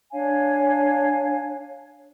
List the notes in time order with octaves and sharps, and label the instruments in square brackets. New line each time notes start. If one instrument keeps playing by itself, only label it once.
[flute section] D4 C#5 F5 G#5